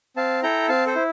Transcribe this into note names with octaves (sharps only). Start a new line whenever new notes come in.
C4 F5 A5
E4 A4 G5 A#5
C4 F5 A5
A4 C5
E4